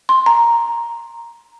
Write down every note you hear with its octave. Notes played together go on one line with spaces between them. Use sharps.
C6
A#5